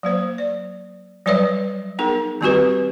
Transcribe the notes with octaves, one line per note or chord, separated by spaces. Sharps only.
F#3 A#3 C5
D5
F#3 G3 B4 C#5 D5 E5
B3 D#4 G#4 A#4
D#3 G3 C4 F#4 G4 B4